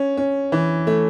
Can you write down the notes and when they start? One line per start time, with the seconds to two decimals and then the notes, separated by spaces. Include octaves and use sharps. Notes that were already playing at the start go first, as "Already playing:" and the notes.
Already playing: C#4
0.17 C#4
0.52 E3
0.87 A3